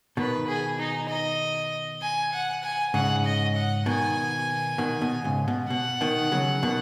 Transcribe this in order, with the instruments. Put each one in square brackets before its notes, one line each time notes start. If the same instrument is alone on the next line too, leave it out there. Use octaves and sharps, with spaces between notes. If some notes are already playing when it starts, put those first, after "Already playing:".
[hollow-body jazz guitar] B2 D#3 [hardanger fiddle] B4
[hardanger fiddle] G#4
D#4
D#5
G#5
F#5
G#5
[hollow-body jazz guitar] G#2 C#3 [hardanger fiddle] F#5
[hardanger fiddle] D#5
F#5
[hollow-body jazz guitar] B2 D#3 [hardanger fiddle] G#5
[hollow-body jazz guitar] B2 D#3
B2
G#2 C#3
B2
[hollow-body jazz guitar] B2 [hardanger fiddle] F#5
[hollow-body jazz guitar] B2 D#3
C#3 F#3
B2 D#3